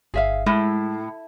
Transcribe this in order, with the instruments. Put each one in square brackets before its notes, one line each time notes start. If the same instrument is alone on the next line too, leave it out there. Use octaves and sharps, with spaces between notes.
[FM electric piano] G1 [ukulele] G#4 E5 F5
[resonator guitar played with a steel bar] A2 [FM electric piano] G#3 [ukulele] E4